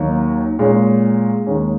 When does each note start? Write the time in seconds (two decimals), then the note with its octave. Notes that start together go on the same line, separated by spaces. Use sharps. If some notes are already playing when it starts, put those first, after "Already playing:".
Already playing: D#2 D#3 F#3 A#3 D#4
0.59 A#2 G#3 C#4
1.46 D#2 D#3 G#3 C#4